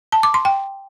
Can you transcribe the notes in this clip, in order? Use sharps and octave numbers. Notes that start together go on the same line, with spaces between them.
A5
D6
C6
G5